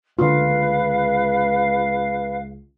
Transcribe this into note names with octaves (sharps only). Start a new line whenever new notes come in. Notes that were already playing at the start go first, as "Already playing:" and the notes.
C#2 D3 F4 B4 F5